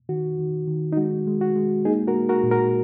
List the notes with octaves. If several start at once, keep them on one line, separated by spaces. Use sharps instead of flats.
D#3 F#4
D#3
D#3
D#4
G#3 F#4
G#3
F#4
G#3
A#3 D#4 G#4
F#4 A#4
A#3
F#4 A#4
A#2
F#4 A#4